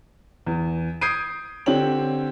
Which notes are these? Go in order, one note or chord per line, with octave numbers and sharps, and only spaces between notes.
E2
D#6 G6 G#6 C7 D7 D#7
D3 C4 G4 C#5 F#7